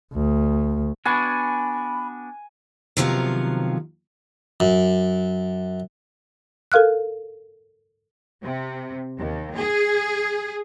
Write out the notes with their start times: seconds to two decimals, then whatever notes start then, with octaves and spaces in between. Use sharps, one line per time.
0.14 D2
1.05 B3 D4 F#4 G#5 B5
2.97 C3 D#3 F3 F#3 B3 F5
4.60 F#2
6.72 A4 A#4 F5 F6 F#6
8.42 C3
9.19 D#2
9.56 G#4